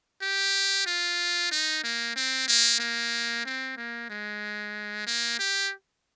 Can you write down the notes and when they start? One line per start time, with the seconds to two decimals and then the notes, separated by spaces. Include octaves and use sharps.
0.22 G4
0.86 F4
1.51 D#4
1.84 A#3
2.16 C4
2.48 A#3
2.80 A#3
3.45 C4
3.77 A#3
4.10 G#3
5.06 A#3
5.39 G4